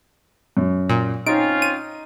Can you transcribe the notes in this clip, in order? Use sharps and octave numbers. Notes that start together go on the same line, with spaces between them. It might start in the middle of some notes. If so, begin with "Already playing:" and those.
F#2
A#2
C4 C#4 D#4 F4 D7
D#7